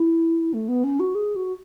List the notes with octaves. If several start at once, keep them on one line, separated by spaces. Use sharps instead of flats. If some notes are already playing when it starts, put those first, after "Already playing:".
Already playing: E4
A3
B3
C#4
F#4
G#4
F#4